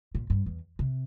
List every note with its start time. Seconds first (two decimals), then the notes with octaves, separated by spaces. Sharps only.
0.15 A#2
0.30 G2
0.46 E2
0.79 C3